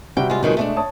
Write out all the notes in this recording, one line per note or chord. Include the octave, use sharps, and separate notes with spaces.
C3 G3 F#4 G5
G#3 F4
F2 B2 D#3 F#3 G#3
A3 C#4 D4
C#5 A5 D#6